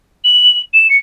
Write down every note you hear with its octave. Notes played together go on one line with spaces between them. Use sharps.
F#7
E7
C#7